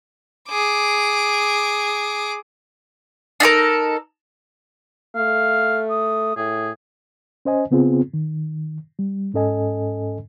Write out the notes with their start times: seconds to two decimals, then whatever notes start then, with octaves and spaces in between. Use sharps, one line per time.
0.49 G#4 D6
3.40 D4 D#4 A4 A#4
5.16 A3 F5
5.90 D#6
6.37 A2 G#4
7.45 C#4 C5 D#5 G#5
7.71 C#3 B3 C4 F4 G#4
8.14 D#3
8.99 G3
9.34 G#2 C#4 A4 D#5 G#5